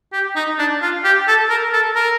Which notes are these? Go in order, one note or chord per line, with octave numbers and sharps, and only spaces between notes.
G4
D#4
D4
F4
G4
A4
A#4
A4
A#4